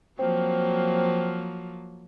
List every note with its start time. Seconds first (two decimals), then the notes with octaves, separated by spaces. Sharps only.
0.19 F3 F#3 A#3 C4